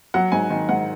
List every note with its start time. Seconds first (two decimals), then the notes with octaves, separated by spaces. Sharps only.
0.14 F#3 F#5
0.32 G#2 G#5
0.50 D#3 G#5
0.69 G#2 F#5